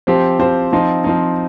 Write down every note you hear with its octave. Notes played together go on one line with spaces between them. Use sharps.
F3 C4 G4 C5
F3 C4 G4 C5
F3 C4 D#4
F3 C4 D#4